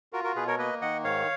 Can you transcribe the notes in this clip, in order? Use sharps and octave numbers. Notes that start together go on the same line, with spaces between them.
F4 F#4 A#4
F#4 A#4
B2 G#4 B4
A#4 C#5
A#3 B4 D#5
D#3 D#5 F#5
G#2 C#5 F5